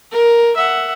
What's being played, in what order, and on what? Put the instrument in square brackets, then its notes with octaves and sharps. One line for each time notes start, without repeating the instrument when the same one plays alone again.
[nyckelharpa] A#4
E5 F#5